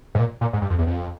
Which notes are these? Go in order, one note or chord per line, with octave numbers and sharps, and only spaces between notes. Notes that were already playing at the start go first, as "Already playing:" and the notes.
G#2
A#2
A#2
G#2
G2
F2
E2
F2